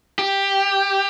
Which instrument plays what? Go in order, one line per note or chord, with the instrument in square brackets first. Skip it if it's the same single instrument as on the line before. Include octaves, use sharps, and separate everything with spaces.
[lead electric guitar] G4